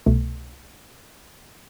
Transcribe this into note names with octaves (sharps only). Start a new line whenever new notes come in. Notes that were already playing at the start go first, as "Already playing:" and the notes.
C2 B2 A3